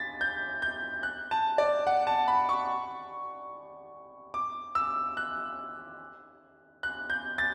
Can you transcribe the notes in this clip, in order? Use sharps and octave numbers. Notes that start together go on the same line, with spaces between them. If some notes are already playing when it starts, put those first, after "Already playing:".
Already playing: A6 B6
G6
G6
F#6
A5
D5
F#5
A5
B5
C#6
D6
E6
F#6
F#6
G6
A6